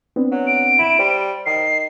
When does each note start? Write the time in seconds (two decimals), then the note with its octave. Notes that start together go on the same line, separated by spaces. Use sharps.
0.16 B3 C4 D4
0.31 F#3
0.47 D7
0.79 E4
0.99 G3 C5
1.46 D#3 C7